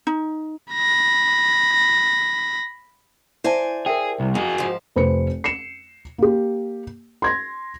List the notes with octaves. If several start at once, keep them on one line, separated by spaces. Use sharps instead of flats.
D#4
B5 A#6
E4 C5 D5 E5 G#5 A5
G#4 A#4 E5 G5
C2
F2 F#4 G#4
G#2 F3
F1 B4 C5 C#7
C7 C#7 E7
A#3 G4
C6 G#6 A#6